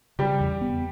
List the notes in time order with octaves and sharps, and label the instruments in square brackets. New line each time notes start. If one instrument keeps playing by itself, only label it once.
[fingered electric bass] C#3 [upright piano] G3 G4
[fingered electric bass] E2
B3